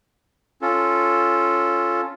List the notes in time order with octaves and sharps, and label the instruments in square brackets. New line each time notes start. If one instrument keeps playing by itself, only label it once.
[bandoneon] C#4 F4 A4